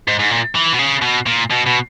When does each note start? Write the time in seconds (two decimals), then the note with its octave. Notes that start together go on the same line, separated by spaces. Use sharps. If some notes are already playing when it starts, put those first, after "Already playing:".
0.08 G#2
0.19 G#2
0.30 A#2
0.55 E3
0.73 B2
0.79 C#3
1.02 B2
1.26 A#2
1.50 B2
1.66 B2